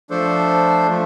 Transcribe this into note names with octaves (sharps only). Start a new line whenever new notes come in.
F3 A3 D4 A4 C5
F3 A3